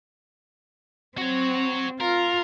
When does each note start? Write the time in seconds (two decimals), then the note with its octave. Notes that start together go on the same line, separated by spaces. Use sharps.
1.18 C4 F#4 C#5
2.00 F4 A#4